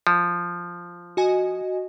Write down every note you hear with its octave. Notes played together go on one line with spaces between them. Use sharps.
F3
F#4 D#5 G#5